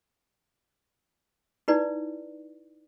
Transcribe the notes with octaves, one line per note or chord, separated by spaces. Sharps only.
D#4 E4 B4 D5